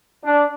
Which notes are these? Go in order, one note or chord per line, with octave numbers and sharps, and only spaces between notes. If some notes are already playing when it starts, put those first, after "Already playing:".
D4